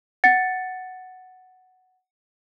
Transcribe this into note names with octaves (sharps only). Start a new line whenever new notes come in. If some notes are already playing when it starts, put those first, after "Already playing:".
F#5 A6 C#7